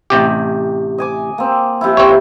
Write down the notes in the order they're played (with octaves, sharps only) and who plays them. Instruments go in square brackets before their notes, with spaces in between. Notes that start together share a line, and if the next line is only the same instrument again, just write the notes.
[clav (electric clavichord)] A1 C3 G4
[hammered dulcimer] D#5 G#5 D6
A#3 C4
C3 F3 E4
[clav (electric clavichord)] C4 C#5